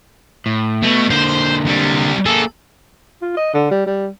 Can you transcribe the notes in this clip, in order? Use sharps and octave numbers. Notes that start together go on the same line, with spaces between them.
A2
B2 A3
D3 A#3 C5
C3 G3
A#3 G#4 A4
F4
D#5
D3
G3
G3